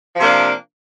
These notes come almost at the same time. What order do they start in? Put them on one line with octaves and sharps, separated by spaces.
F3 C3 A#3 D4